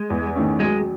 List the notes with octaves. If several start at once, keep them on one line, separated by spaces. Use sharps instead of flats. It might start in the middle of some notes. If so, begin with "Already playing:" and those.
Already playing: G#3
E2
D#3 A3 C#4
F#3 G#3